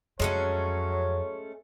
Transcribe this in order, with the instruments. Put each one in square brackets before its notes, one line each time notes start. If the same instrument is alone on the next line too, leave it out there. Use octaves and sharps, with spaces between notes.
[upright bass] F2 [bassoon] F#3 [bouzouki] G#3 A3 C#4 [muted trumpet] C#5